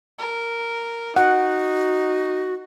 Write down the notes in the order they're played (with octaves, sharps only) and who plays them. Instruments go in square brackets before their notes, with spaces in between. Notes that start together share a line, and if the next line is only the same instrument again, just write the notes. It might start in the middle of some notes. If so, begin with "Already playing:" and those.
[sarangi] A#4
[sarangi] D#4 [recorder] F#4 [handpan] F#5